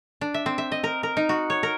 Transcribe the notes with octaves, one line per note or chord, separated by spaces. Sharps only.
D4
E5
C4
E5
D#5
A#4
A#4
D#4
F#4
C#5
A#4